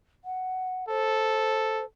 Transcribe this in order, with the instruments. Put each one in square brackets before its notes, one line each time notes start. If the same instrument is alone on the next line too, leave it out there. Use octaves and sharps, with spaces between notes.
[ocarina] F#5
[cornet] A4 [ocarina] C5